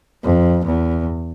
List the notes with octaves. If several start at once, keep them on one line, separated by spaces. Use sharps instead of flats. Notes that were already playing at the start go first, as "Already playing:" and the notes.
F2
E2